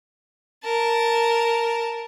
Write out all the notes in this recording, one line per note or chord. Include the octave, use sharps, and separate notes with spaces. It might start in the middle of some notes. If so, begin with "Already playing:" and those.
A#4 A5